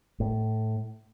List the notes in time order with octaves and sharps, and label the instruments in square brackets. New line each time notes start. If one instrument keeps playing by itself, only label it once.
[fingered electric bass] A2